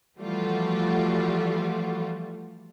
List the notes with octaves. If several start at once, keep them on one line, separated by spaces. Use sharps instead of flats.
E3 F3 G3 A3 F4 F#4